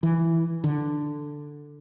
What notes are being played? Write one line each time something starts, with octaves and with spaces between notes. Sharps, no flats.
E3
D3